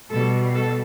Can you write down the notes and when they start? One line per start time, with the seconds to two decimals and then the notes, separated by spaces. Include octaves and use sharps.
0.10 B2 G3 A4
0.53 A4